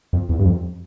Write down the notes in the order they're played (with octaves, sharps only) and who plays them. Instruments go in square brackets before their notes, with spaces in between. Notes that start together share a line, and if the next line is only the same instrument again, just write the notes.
[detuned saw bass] F2
E2
G2
F2